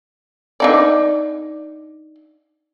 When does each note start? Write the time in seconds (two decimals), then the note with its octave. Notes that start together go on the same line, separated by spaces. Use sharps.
0.60 D4 D#4 D5